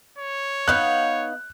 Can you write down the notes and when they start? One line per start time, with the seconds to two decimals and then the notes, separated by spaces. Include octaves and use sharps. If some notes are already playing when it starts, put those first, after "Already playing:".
0.18 C#5
0.68 B3 D#4 F5 F#6